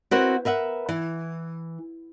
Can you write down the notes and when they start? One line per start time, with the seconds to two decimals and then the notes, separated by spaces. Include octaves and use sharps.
0.11 C4 E4 F#4 A#4 B4 C#5
0.45 A#4 B4 E5 F#5
0.89 E3